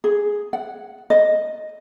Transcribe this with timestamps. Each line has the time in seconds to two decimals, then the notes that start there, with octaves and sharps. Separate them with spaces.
0.04 G#4
0.53 F#5
1.10 D#5